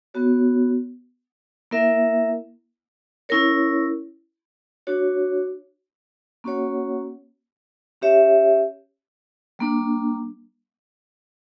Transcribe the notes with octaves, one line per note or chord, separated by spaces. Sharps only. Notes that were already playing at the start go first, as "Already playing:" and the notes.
B3 F#4 C#5
A#3 E4 A#4 E5
C#4 E4 A#4 C#5
D4 F#4 C#5
A#3 C#4 F#4 C#5 F#5
C#4 G4 C#5 E5
G3 A#3 D4